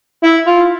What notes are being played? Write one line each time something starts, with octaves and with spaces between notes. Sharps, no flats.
E4
F4